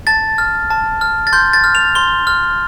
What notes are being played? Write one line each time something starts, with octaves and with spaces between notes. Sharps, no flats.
A5 A6
F6
A5
F6
A6
C6 G6
A6
F6
F7
C6 G7
F6